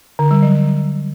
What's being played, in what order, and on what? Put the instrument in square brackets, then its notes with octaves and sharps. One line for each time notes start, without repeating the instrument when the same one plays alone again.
[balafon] D3
G3
F#3